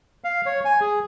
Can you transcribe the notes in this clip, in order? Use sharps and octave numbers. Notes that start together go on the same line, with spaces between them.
F5
C#5
G#5
G#4